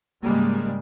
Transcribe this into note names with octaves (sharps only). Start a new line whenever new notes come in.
G#2 C#3 G3 G#3 A#3